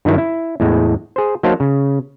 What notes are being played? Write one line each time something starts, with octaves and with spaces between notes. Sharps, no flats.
G2 D#3 F#3 E4
E4
E2 A2 G#3
G#4 C5
F#3 A#3 D#4 C5 F5 A5
C#3